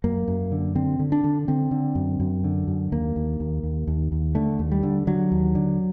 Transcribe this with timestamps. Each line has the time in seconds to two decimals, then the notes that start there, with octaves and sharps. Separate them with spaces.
0.04 F#2 A#3
0.28 F#2
0.52 D3
0.75 D3 C4
0.99 D3
1.12 D4
1.24 D3
1.48 D3 C4
1.71 D3
1.95 F#2
2.20 F#2
2.44 D3
2.68 F#2
2.92 D#2 A#3
3.16 D#2
3.40 D#2
3.63 D#2
3.87 D#2
4.12 D#2
4.35 D3 A3
4.59 D#2
4.72 G3
4.83 D3
5.07 D3 F#3
5.32 D#2
5.55 D3